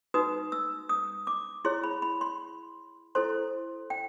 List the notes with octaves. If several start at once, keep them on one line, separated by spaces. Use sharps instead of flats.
D#4 F#4 B4 D#6
E6
D#6
D6
E4 G#4 C#5 C6
B5
B5
C6
E4 A4 C5 C6
G5